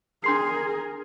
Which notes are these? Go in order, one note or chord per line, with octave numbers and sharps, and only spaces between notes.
D4 G#4 A#4 C6 C7